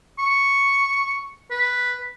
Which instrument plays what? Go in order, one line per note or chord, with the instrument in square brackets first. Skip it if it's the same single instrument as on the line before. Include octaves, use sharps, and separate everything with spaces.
[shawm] C#6
B4